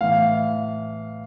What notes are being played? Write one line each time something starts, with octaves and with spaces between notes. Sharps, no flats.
A2 E3 F5